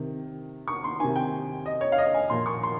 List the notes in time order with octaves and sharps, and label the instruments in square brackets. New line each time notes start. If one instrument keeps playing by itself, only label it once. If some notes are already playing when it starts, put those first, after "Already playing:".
Already playing: [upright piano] C3 D#3
C#6
C6
C3 D#3 G#5
G5
D#5
C#5
F5
D#5
G#5
A#2 F3 C6
C#6
C6